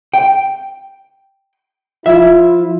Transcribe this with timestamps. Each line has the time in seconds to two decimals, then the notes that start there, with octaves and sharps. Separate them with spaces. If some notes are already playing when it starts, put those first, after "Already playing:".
0.14 G5
2.06 F3 E4 F4 E5